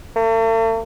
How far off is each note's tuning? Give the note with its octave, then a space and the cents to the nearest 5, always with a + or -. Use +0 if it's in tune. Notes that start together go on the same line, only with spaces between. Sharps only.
A3 +45